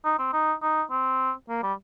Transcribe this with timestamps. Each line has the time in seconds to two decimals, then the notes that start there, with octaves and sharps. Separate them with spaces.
0.04 D#4
0.19 C4
0.33 D#4
0.62 D#4
0.91 C4
1.49 A#3
1.63 G3